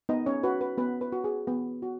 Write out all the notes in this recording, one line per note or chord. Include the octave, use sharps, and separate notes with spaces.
B3 D#4 D#5
C#4 C#5
F#4 B4
B4
B3 B4
B4
F#4
G#4
B3
F#4